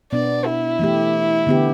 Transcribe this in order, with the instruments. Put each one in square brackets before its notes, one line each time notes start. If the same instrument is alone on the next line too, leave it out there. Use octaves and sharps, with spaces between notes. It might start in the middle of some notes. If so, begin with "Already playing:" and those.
[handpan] B2 B3 D4 [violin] D5
[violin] E4
[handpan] E3 A3 G4
D3 B3 G4